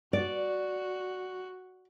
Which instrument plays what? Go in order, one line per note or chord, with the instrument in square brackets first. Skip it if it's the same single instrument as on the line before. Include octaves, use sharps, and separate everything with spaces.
[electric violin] F#4 [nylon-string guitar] D5